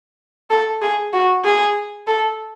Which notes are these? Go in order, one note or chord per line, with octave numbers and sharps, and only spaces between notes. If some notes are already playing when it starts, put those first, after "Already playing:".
A4
G#4
F#4
G#4
A4